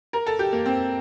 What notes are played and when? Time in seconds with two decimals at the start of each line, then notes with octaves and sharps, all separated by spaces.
0.13 A#4
0.26 A4
0.39 G4
0.52 A#3
0.66 C4